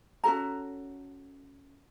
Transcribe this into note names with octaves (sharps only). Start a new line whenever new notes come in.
C#4 F#4 A4 A#5